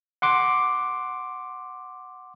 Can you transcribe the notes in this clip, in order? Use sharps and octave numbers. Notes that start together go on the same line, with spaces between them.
F#5 C6 D6